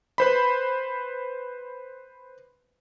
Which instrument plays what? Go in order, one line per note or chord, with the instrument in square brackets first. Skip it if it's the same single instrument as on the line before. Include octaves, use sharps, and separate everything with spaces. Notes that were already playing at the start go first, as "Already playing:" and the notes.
[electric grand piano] B4 C5 B5